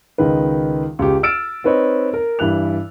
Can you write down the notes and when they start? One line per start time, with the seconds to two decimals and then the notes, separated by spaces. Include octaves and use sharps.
0.18 C#2 D#3 D#4 B4
0.99 C#2 G4
1.23 E6 F6 A6 D7 E7
1.64 C4 D#4 B4 C#5 D#5
2.14 A#4
2.39 G2 E3 F#6 F7